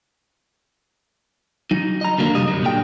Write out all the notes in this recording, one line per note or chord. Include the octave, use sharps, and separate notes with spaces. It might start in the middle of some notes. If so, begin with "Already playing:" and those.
F#3 D#4
D#5 A#5
D#2 D3 F#3 A#3
C2 F2 G3 D#5
F#2 F#3
A#2 D3 G5